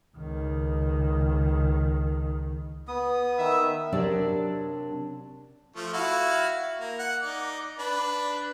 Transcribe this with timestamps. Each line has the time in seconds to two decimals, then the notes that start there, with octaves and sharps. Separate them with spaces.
0.17 C#2 D#3
2.88 B3 D#6
3.38 D#3 E5
3.92 C3 F#3 D4 G4 A#4 D5
5.76 F3 A3
5.93 E4 F#4 F5
6.79 A#3
6.99 F#5
7.23 D#4 D5
7.79 D4 B4